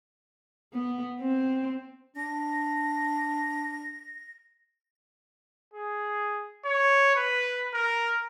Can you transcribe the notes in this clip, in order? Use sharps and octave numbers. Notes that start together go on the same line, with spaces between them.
B3
C4
D4 A#6
G#4
C#5
B4
A#4